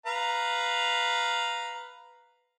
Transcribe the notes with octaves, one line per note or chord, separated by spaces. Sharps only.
B4 F5 A#5